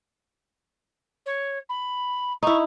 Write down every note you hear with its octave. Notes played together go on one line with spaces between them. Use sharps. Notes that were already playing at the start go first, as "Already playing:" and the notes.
C#5
B5
D#4 E4 C#6